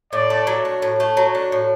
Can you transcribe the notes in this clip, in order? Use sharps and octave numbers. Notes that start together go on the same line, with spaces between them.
A2 D5
A3
F#3
D4
A2
A3
F#3
D4
A2